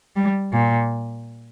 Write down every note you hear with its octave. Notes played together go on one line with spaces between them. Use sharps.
G3
A#2